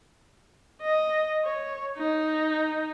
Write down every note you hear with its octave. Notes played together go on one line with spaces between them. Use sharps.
D#5
C#5
D#4